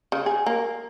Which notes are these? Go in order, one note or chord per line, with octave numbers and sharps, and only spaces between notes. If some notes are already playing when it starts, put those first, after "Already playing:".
C#3
G#4
A#3